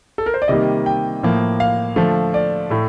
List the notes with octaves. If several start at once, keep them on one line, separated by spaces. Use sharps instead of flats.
A4
A#4
C5
D5
C3 D#3 G3 A#3 D#5
G5
A2 F3 A#3
F5
D3 F3 A3
D5
A2 A3